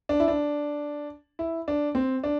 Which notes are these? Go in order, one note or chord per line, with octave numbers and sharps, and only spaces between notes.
D4
E4
D4
E4
D4
C4
D4